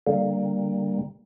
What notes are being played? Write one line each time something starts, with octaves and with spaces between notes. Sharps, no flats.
D3 G3 A#3